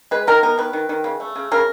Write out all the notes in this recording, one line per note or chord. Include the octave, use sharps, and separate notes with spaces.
G#3 B4
D#3 A#4
B3 A#4
D#3 B4
D#3
D#3
C#3
A3
C#3
C#3 A#4